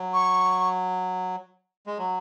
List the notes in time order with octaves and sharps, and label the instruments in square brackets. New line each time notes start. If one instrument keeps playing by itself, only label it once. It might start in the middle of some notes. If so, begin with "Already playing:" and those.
Already playing: [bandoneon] F#3
[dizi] C#6
[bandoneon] G#3
F#3